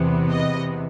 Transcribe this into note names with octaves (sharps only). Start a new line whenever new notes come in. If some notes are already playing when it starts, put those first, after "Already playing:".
Already playing: E2 C3 E3 B3
D#5